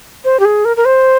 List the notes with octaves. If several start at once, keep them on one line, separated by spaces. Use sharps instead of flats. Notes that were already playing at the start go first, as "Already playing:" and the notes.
C5
G4
G#4
A#4
A#4
C5